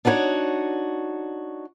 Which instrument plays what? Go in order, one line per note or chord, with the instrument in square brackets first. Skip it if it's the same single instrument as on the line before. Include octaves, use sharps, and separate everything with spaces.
[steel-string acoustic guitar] D4 D#4 F#4 B4 C#5